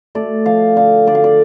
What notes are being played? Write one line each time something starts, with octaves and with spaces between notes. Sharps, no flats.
A3 D5
F3 F5
D3 F5
D3 D5
F5
D5